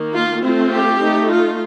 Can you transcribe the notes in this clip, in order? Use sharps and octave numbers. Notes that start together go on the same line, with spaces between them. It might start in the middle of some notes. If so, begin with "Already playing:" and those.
Already playing: D#3 A#3
F4
A3 C4 F4
G4
A3 D#4
F4